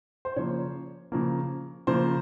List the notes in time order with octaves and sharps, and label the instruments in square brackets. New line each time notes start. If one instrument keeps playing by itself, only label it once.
[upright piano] C5
C#3 F3 A#3 C#5
C#3 F3 A#3
C#3 F3 A#3 C5